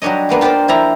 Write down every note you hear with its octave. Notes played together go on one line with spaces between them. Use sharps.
F#3 G3 D4 C#5 D#5
G#3 A#3 B3 D4
F4 G4 A#4 C5 D5
F3 E4 G4 A#5